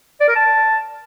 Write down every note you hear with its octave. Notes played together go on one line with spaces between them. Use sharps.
D5
A#4
A5